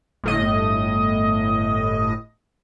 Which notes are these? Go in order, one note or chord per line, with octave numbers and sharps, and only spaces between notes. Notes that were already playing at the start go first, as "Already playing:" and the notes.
G1 A2 D#5